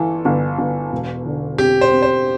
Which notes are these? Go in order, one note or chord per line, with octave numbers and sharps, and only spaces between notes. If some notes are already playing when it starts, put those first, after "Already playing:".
Already playing: G1 E3 A4
G1
G1
E1
D3
C4 G4
C5
C4
C5